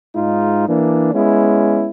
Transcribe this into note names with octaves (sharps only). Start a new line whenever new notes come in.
G#2 G#3 D#4 F4
E3 A#3 D4
G#3 B3 C#4 E4